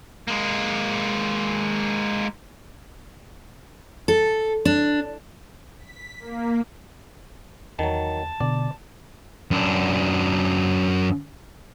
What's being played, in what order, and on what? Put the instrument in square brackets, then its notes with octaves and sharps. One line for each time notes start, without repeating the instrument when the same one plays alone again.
[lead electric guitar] G#3 A#3
[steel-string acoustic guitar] A4
D4
[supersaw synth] B6
A#3
[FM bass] E2 [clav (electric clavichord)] D#3 F#3 [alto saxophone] A5
[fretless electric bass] B2 [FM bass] D3 [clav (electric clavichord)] D5
[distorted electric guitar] F#2 D4